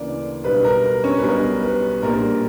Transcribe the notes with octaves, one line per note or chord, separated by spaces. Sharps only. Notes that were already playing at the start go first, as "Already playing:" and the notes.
Already playing: D2 C#3 E3 A#3 D4 D5
B1 B2 G3 B3 D4 B4
A#4
C#4 C#5
B4
B1 B2 G3 B3 D4 A#4
B4
A#1 A#2 G3 A#3 D4 A#4